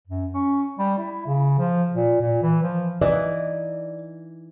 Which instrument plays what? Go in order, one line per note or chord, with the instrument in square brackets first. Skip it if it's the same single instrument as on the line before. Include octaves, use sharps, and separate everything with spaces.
[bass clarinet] F#2
C#4
G3
E4
C#3
F3
A#2
A#2
E3
F3
[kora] E3 D#4 [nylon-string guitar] D5